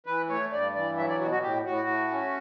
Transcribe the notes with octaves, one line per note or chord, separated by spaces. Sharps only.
E3 B4
A3 C#5
G2 D5
E3 D5
F#3 E5
D5
B2 F#4
F#4
A2 G4
A2 F#4
A3
C#4